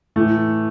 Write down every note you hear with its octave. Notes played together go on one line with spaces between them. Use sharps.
A2 E3 A3